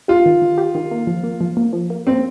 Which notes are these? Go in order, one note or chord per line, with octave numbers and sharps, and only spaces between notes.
F4 G4
D#3
D#3
G4
D#3
A#3
F3
A#3
F3
A#3
F3
A#3
A#3 C4